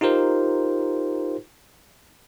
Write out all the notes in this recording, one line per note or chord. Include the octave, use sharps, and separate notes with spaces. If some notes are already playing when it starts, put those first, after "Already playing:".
D#4 F4 G4 A#4 C5